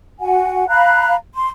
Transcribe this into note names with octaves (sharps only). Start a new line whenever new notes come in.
F#4 F#5 G#5
F5 A#5 B5 F#6
C6